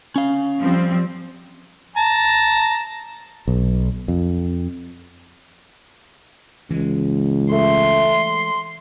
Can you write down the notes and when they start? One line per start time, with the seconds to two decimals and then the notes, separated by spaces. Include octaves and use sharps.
0.16 C#4 F5
0.60 F3 G3 C4
1.97 A5 A#5
3.48 B1
4.08 F2
6.71 C#2 E3 G#3
7.52 A3 C6